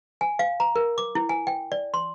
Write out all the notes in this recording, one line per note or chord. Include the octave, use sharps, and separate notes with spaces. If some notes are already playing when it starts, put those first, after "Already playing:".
G#5
F5
A#5
A#4
D6
E4
G#5
G5
D5
C6